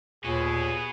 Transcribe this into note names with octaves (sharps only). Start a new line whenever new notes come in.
D#2 A#2 B3 F#4 G#4